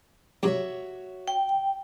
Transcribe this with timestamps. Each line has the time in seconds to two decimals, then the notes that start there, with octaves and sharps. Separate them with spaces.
0.43 G2 C3 F#3 F#4 C#5 E5
1.28 G5